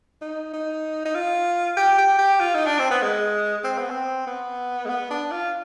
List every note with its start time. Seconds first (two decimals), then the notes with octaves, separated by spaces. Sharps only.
0.22 D#4
0.53 D#4
1.05 D#4
1.15 F4
1.77 G4
1.98 G4
2.18 G4
2.40 F4
2.55 D#4
2.66 D4
2.79 C4
2.91 B3
3.02 G#3
3.64 C4
3.78 B3
3.90 C4
4.27 B3
4.85 G#3
4.89 B3
5.10 D4
5.31 F4